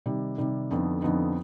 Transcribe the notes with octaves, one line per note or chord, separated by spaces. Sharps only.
C3 D#3 G3
C3 D#3 G3
F2 D3 F3 B3 D#4
F2 D3 F3 B3 D#4